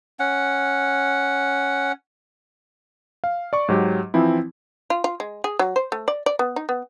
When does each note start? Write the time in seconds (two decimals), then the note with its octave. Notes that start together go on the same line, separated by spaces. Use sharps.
0.19 C#4 F#5
3.24 F5
3.53 D5 C#6
3.69 G#2 F#3 G4
4.14 E3 F3 C4 E4
4.90 F4
5.04 F4
5.20 G#3
5.44 G#4
5.59 F#3
5.76 C5
5.92 A3
6.08 D5
6.26 D5
6.39 B3
6.56 D#4
6.69 B3